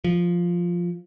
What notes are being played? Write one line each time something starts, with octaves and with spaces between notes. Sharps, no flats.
F3